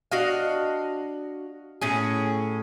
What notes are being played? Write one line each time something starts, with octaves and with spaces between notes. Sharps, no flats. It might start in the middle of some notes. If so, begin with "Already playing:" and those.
D4 F#4 D#5 F5
A2 C#4 G#4